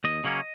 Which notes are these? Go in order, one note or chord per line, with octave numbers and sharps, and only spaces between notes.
D#2 D#5
C#3 F#3 A#3 C#4